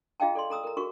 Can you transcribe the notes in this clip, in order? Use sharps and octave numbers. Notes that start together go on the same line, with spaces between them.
F4 G#4 D#5 F5 G5 A5
A4 D5 C6
A4 A#5 D#6 E6
A#4 A#5
F#4 G#4 A#4 C#6